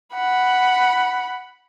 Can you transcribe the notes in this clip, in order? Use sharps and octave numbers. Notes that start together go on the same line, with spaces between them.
F#5 B5